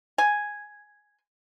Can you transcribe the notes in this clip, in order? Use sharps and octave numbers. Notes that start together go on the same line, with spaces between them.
G#5